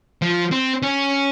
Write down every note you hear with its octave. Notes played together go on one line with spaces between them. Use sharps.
F3
C4
C#4